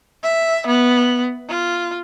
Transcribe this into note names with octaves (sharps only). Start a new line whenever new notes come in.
E5
B3
F4